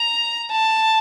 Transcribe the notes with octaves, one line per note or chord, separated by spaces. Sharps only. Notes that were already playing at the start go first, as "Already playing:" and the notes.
Already playing: A#5
A5